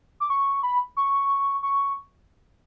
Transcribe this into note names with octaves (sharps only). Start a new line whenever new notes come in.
D6
C#6
B5
C#6
C#6